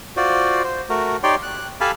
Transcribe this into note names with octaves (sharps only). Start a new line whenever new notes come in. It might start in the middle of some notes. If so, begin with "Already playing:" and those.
F4 F#4 C5 D5
C5
A3 F#4 A#4
D#4 G4 C#5 D5 G5 C6
F#6
G4 A4 F5 G#5 A5 B5